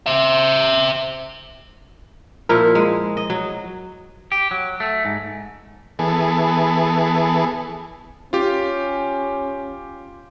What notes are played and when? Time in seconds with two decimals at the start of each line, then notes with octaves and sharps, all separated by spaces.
0.06 C5 E5
2.49 A#2 F3 E4 A#4
2.75 G#3
3.17 D#5
3.30 F#3
4.32 G4
4.51 F#3
4.80 A3
5.05 G#2
5.99 E3 B3 G#4 A4
8.33 C#4 F4 G4